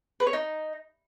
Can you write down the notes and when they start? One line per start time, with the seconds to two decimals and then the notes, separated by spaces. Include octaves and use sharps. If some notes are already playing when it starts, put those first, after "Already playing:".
0.20 B4
0.27 C#5
0.33 D#4